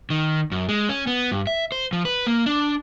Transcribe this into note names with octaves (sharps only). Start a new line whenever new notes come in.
D#3
F#2
G#3
C#4
B3
G2
E5
C5
F3
B4
A#3
D4